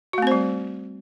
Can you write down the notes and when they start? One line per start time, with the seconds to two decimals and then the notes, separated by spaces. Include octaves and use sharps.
0.13 F#4
0.18 A3
0.22 C4
0.27 C5
0.31 G3